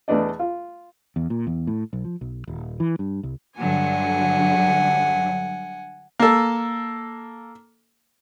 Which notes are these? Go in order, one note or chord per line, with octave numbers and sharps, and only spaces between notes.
E2 A3 B3 D4 D5 D#5
F4
E2
A#2
E2
A2
B1
F3
B1
D#1
E3
G2
C2
G2 D3 F#3 F#5 G#5
A#3 A4